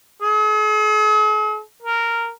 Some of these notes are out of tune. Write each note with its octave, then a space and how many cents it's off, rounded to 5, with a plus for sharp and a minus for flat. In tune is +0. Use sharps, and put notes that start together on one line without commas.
G#4 +45
A#4 -10